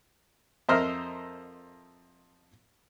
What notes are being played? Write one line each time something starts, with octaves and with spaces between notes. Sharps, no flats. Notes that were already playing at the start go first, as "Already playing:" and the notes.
F2 A#4 C5 D#5 E5 F6